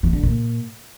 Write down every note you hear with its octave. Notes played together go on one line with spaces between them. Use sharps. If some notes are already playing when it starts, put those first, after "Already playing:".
E3
D3
A#2